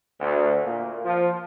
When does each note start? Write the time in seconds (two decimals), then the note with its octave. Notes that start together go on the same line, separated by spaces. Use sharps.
0.19 D2
0.64 A#2
1.03 F3